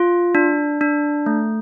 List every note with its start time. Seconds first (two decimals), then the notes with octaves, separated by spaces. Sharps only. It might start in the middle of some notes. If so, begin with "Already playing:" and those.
Already playing: F4
0.35 D4
0.81 D4
1.26 A3